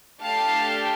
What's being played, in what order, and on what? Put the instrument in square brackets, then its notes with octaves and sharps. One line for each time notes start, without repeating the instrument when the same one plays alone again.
[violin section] A3 D4 G4 F5 A5